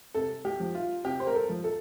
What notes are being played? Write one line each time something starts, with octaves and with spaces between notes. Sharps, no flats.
C3 A4
G4
F3
F4
C3 G4
C5
A#4
A4
F3
A4